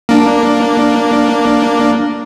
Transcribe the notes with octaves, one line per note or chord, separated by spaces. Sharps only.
A#3 D4